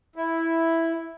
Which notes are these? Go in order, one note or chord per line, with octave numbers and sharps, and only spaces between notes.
E4